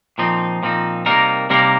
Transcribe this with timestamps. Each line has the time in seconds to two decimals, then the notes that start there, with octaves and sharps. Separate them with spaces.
0.18 A#2 F3 C4 D#4
0.63 A#2 F3 C4 D#4
1.06 C3 G3 A#3 D#4 A#4
1.50 C3 G3 A#3 D#4 A#4